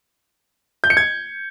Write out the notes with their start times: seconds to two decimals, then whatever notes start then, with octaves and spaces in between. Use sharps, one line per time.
0.84 G6
0.90 C#7
0.97 G#6